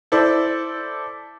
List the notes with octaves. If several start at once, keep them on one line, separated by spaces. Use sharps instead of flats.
E4 A4 C5 D5